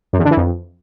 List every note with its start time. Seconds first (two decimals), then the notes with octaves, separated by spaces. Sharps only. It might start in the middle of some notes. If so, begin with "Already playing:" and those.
0.13 F#2
0.19 E2
0.25 D3
0.31 E3
0.37 F2